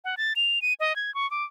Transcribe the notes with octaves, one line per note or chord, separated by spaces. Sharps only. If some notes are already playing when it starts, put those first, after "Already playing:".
F#5
A6
F7
D#7
D#5
G#6
C#6
D6